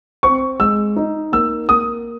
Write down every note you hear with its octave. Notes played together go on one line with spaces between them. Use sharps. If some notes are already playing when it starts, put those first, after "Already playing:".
C4 C#6
G#3 E6
D#4
A#3 E6
A#3 D#6